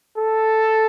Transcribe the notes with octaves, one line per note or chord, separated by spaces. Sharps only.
A4